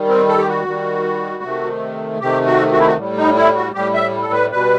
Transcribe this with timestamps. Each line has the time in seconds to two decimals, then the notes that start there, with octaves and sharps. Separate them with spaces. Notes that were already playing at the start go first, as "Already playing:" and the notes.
Already playing: D#3 G3
0.09 C4
0.28 A4
0.38 G4
0.48 F#4
0.67 D#3 G3
1.43 C3 D#3 A3
2.20 C3 D#3 A3 G4
2.46 F#4
2.72 F#4
2.79 E4
2.87 F#4
2.97 A2 G3
3.17 D#4
3.36 E4
3.55 F#4
3.75 A2 G3 G4
3.94 E5
4.22 A4
4.32 B4
4.52 B2 G3 B4